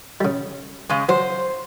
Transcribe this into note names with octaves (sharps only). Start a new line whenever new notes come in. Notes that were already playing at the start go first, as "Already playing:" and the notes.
C#3 G3
C#3 G#3
F#3 C5